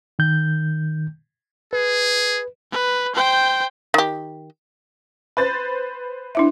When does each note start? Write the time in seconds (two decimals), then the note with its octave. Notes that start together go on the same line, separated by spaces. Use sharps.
0.19 D#3 G6
1.73 G#4 B4
2.72 B4
3.15 C5 G5
3.94 D#3 G4
5.37 B4 C5 A6
6.35 D4 E4 E5